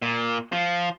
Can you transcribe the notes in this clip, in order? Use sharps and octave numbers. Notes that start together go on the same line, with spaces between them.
A#2
F3